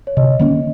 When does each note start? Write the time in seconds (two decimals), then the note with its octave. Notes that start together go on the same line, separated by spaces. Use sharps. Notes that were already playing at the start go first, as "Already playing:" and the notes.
0.07 C#5
0.17 C3 D#5
0.39 D#3 A#3 C#4